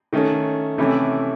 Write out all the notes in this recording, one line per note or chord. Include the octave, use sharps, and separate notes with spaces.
D#3 A3 C#4
C3 E3 A3 C#4 E4